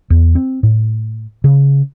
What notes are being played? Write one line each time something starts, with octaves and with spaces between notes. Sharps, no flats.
E2
C4
A2
C#3